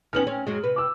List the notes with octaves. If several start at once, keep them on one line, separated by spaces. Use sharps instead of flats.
D#3 B3 C#4 F6 F#7
C4 C#4
F#2 F#3 G#3
C3 B4
D6 E6